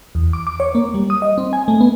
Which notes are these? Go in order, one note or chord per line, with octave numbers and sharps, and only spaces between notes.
E2
D6
D6
C#5
A#3
G3
D#6
D#5
C4
G#5
A3
B3